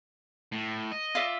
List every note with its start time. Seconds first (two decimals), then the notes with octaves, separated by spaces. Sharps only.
0.52 A2
0.92 D#5
1.15 F4 D5 E5